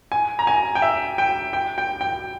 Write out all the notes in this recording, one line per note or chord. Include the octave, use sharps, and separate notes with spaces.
G#5
A#5
G#5
G5
E5
G5
G5
G5
G5